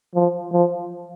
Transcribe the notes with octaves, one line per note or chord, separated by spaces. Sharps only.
F3
F3